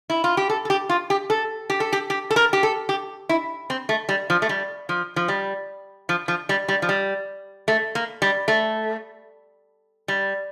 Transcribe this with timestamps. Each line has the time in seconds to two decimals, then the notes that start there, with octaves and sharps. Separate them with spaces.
0.10 E4
0.24 F4
0.37 G4
0.50 A4
0.65 A4
0.70 G4
0.89 F4
1.10 G4
1.30 A4
1.70 G4
1.80 A4
1.93 G4
2.10 G4
2.31 A4
2.36 A#4
2.53 G4
2.63 A4
2.89 G4
3.29 E4
3.70 C4
3.89 A3
4.09 G3
4.30 F3
4.42 A3
4.49 G3
4.89 F3
5.16 F3
5.28 G3
6.09 F3
6.28 F3
6.49 G3
6.68 G3
6.82 F3
6.89 G3
7.68 A3
7.95 A#3
8.22 G3
8.48 A3
10.08 G3